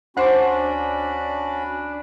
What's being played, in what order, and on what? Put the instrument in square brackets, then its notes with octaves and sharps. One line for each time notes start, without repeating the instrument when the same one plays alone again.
[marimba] D2 C5 C6 [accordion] C#4 F#4 B5 [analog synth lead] D4